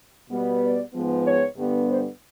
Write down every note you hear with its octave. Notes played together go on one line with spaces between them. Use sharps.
B2 G3 B3
D5
G#2 F3 G#3 B3
C#5
G2 D3 G3 B3
C5